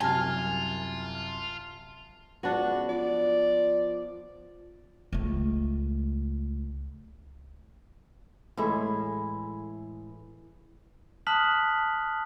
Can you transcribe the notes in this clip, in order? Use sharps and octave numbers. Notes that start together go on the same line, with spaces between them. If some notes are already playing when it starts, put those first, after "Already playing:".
C2 F#2 F4 G#5 A5 F6
C#2 B3 D4 F#4
F3 D5
C#2 A3
A2 E3 G#3 E4
A5 D#6 F6 F#6 B6 F#7